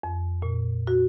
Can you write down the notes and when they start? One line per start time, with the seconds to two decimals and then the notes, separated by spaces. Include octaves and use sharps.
0.03 F2
0.42 A#2
0.87 F#4